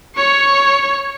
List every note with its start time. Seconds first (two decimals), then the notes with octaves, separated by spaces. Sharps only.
0.16 C#5 C#6